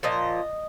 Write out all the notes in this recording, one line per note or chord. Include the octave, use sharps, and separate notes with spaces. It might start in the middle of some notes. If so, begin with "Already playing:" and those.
A#2 F3 D#5